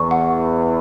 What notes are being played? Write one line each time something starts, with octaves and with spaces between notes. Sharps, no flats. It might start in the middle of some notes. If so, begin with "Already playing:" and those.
Already playing: E2 C#6
F#5